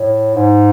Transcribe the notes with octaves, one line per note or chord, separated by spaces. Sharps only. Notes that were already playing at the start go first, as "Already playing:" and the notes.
Already playing: A2
G#2